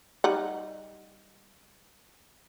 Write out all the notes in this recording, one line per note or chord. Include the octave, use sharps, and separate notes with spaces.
G3 D#4 F#5